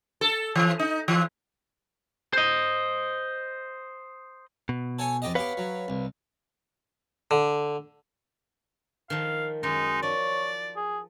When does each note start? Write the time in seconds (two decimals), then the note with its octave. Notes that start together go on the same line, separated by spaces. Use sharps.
0.21 A4
0.56 E3
0.79 D#4
1.08 E3
2.33 C5 D#5
4.69 B2
4.99 A4 C#5 G#5
5.22 F2 G4 D#5
5.35 B3 G4 B4 C#5 F5
5.57 F#3
5.88 C2
7.31 D3
9.10 D#3 F3 F5
9.63 F#2 D#3 G#3 D#4
10.03 F3 C#5 D5
10.76 G#4